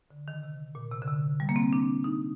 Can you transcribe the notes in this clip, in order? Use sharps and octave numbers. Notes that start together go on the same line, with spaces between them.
D3
D#3
C3
A#2
C3
D3
C3
G3
A#3
C4
D4
D#4